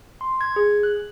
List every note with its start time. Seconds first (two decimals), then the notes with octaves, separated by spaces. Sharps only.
0.21 C6
0.41 G#6
0.56 G#4
0.83 F#6